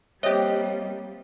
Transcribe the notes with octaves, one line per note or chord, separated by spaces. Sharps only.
F3 G3 A#3 C4 G4 C#5 D#5 E5